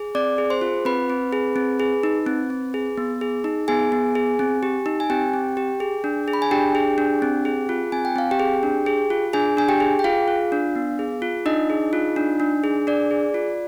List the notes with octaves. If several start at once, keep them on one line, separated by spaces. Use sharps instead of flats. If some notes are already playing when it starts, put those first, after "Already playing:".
Already playing: G#4
C4 D5 D6
G#4
C5 C6
F4
C4 B4 B5
C4
G#4
C4
G#4
D#4
C4
C4
G#4
B3
G#4
D#4
B3 G#4 G#5
B3
G#4
C4
G4
D#4
G#5
C4 G4 G5
C4
G4
G#4
D4
G#4
B5
G#5
D4 G4 G5
G#4
D4
C4
G#4
F4
C4 G#5
G5
C4 F5
G4 G5
G#4
D4
G#4
F4
D4 G#4 G#5
D4 G#5
G4 G5
G#4
G5
F4 G#4 F5
F4
D4
B3
G#4
F4
D4 D#4 D#5
G#4
F4
D4
D4
G#4
D4 D5
G#4
F4